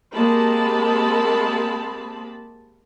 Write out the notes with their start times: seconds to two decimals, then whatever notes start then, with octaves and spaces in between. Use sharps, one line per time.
0.13 G#3 A#3 C4 G4 A5 B5